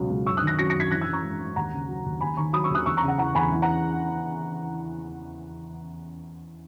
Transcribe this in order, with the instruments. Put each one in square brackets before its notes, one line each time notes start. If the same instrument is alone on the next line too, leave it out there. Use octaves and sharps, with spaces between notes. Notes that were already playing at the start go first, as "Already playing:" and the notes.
Already playing: [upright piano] C#2 B2 F#3
C#2
F#2 C#6 E6
D#6 F#6
D#3
F#6 A#6
F#3 A#6 C#7
A#6 C#7
F#2
G#6 B6
E3 F#6 A#6
E6 G#6
E3
A#5 C#6
G#2
G#2
D#2 F#5 A#5
C#3
F#3
D#2
D#2 G#5 B5
D#3 A#5 C#6
F#3 B5 D#6
C#6 E6
D#2 D#6 F#6
E2 C#6 E6
A#5 C#6
C#3
F#5
E3 F#5 A#5
E2 G#5 B5
E3
F#5 A#5